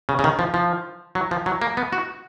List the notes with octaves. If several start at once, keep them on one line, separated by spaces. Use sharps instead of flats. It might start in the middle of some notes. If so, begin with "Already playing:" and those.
C#3
C#3
D#3
F3
F3
F#3
F3
F#3
A#3
B3
F#4